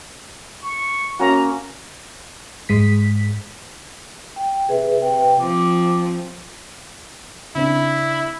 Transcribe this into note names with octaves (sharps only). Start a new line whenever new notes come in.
C#6
A#3 C#4 F#4 A#5
G#2 G#3 B6
G5
C3 G#4 B4 E5
C3 B4 G5
F3 C4 D6
C#3 C4 D4 E4